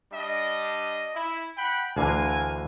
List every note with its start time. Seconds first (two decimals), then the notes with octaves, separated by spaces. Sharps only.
0.13 G3 D4 D#5
1.15 E4
1.58 F#5 G5 B5
1.97 D2 D3 E3 A#4 F5 G#5